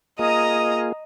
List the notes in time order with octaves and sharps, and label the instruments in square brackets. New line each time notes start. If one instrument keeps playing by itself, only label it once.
[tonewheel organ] A#3 F4 G#4 [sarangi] D#5 [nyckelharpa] A#5 D#6